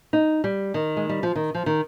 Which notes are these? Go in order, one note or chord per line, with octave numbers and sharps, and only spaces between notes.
D#4
G3
D#3
G#3
G3
F3
D#3
F3
D#3